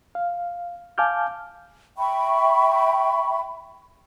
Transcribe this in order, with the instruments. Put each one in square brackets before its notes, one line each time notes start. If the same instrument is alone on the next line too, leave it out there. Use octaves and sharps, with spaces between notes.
[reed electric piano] F5
F5 G#5 A5 D6 F6 G6
[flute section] E5 G5 B5 C#6